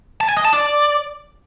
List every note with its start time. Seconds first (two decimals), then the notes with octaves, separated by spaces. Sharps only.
0.21 A5
0.29 G#5
0.37 D#5
0.45 A5
0.53 D5